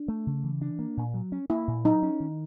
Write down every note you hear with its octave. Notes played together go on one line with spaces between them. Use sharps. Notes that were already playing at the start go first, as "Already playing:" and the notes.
Already playing: D4
A3
C#3
E3
D4
A#3
A#2
F#3
C#4
A#3 E4
A#2
F#3 D#4
C#4
D#3